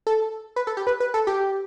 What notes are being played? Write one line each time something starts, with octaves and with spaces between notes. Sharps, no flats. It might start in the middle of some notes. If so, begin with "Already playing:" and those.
A4
B4
A4
G4
B4
B4
A4
G4